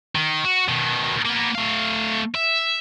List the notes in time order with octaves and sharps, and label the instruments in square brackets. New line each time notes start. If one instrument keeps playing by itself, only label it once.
[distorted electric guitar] D#3
F#4
B2 D#3
A#3 B3
A3 F5
E5